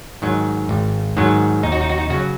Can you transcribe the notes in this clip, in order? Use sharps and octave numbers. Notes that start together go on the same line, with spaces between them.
G#2 D#3 F#3
G#1
G#2 D#3 F#3
D#2 D#4
F#4
D#4
F#4
D#4
C#3 F#3 F#4